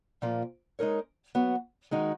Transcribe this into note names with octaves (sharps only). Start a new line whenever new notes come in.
A#2 F3 A#3 F4
G#3 D#4 A#4 C#5
F#3 B3 F#4
D#3 G#3 D#4 F#4